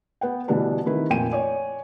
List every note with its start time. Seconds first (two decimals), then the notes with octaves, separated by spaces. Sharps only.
0.21 B3 F#5 G5
0.48 B2 D3 E3 G3 D4 B4
0.86 C3 D#3 E4 B4
1.10 F2 A#2 G5 G#5 D#7
1.31 C#5 D5 G#5